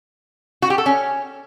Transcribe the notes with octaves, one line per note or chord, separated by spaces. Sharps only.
F#4
G4
A4
C#4